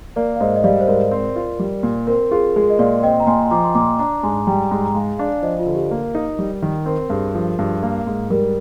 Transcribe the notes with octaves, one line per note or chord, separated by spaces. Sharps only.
A#3 A#4 D5
F5
G#2 C5 D#5
D#5
G3 D5 F5
C5
G#2 A#4 D5
C4
F4
G3
A#2
C4 A#4
F4 G#4
G#3 G#4
D#5
A#2 D5 F5
C4 D#5 G5
A#5
A#2 G#5 C6
F3 A#5 D6
C6
A#2 A#5 D6
D4 A#5 D6
G#2 G#5 C6
G3 G5 A#5
G#2
A#5
G#3 F5 G#5
D4 D5 F5
F3 C5 D#5
F4
D3
G4
A#3 A#4
D#4
G3
D#3
C4 A#4
G2 G#4
F3
G2
A#3
G#2
G3 A#4